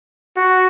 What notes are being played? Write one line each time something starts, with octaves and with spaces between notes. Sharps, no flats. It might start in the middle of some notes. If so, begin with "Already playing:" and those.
F#4